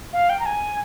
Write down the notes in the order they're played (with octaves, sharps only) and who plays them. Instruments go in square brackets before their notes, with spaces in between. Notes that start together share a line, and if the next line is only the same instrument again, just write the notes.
[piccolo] F5
G5
A#5
G#5